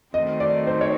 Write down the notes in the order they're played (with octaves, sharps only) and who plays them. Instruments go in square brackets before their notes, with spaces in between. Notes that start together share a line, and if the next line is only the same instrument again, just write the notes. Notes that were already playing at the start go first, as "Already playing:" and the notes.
[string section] D#3 F#3 A3 C4 [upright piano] D#5
[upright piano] D5
C5
C#5